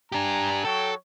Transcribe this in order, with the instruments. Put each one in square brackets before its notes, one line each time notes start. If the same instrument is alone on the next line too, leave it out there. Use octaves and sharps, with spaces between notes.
[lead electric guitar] D4 G4 [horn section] G#5 A#5
[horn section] F#3 C#5 G5 [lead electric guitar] A4